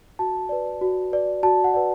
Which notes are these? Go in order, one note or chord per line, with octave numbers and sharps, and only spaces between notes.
F#4 A5
B4 D5
F#4
B4 D5
F#4 A5
F#5
B4 D5